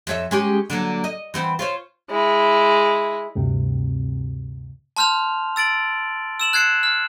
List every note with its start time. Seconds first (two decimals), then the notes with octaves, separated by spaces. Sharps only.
0.07 F2 C#5 E5
0.31 G#3 C#4 G4
0.70 D3 F#3 A#3
1.04 D#5
1.34 E3 B3 C4
1.59 F4 C5 C#5
2.10 G#3 E4
3.35 D2 G2 C3
4.97 A5 C6 F6 G6 F7
5.56 E6 A6 D7 F#7
6.40 E6 E7 F#7
6.53 F#6 G#6 C7 C#7 E7
6.83 F6